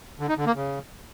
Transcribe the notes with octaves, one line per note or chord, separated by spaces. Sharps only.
D3
D#4
D3
A#3
C#3